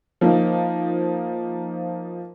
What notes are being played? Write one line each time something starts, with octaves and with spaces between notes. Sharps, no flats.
F3 A#3 D#4